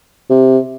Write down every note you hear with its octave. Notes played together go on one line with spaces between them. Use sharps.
C3